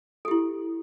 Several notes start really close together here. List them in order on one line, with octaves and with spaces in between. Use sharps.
A4 G4 E4